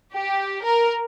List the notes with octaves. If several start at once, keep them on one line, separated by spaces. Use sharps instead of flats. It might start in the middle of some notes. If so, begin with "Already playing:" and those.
G4
A#4